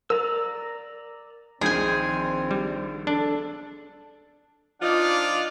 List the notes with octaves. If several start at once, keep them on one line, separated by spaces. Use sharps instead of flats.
A#4 D5 A#5 E6
A#1 D#3 C4 G#4 G#5 G6
G3
D4 A4
F3 D4 D#4 F4 D5 F5